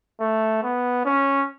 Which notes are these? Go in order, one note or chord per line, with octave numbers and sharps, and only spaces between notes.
A3
B3
C#4